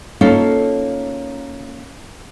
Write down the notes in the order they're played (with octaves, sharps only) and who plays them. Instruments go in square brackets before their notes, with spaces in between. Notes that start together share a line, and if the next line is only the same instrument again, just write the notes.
[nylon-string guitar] A#3 C#4 D#4 F4 A4